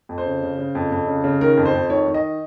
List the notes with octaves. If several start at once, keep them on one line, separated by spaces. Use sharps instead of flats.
F2
C5
C#3
C#3
C#3
F2
F2
C#3
C#3
D#3 A#4
F2
C5
F2
D#3 C#5
D#3
D#5